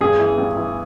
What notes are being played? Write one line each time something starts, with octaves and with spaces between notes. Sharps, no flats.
G2 G#4
E3
G2
E3